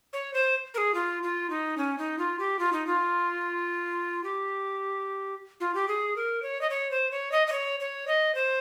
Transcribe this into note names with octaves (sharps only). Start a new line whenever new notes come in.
C#5
C5
A#4
G#4
F4
F4
D#4
C#4
D#4
F4
G4
F4
D#4
F4
G4
F4
G4
G#4
A#4
C#5
D#5
C#5
C5
C#5
D#5
D#5
C#5
C#5
D#5
C5